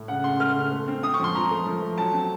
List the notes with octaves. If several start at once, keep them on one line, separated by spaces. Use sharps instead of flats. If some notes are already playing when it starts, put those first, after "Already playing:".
Already playing: A2
C#3 F#5
C#3 C6
A3 F6
C#3
A3
C4
C4 D#6
C#6
F3 C6
F3 A#5
A3
F3
A3
F#3 A5
C4